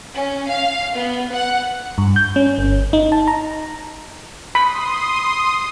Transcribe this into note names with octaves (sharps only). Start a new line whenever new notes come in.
C#4
F5
B3
F#5
G2
G6
C#4
G1
D#4
A5
A#5
B5 C6 D#6